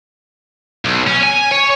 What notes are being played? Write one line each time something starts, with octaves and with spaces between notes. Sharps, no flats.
B1
C#4
G#5
C#5